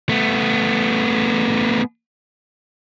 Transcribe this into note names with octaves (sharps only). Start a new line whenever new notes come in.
A3 B3